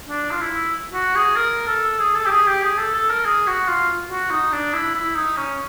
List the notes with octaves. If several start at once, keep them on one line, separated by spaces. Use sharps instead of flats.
D4
F4
E4
F#4
G#4
A#4
A4
G#4
A4
G4
G#4
G4
G#4
A4
A4
A#4
G#4
F#4
F4
F#4
D#4
D4
E4
E4
D#4
C#4